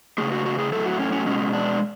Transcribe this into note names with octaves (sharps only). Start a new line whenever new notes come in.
C#3 F3 A3 G#4
F#4
F#4
G#4
A2 F#3 A3 A4
F#4
C#4
C#4
B2 G#3 C#4
D4